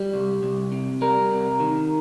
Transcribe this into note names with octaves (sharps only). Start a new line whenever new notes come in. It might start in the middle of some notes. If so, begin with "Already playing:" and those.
Already playing: G3 G4
C2
C2
C3
G3 A#4
C3
D#3